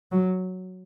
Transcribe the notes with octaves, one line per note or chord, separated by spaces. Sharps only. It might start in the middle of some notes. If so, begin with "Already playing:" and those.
F#3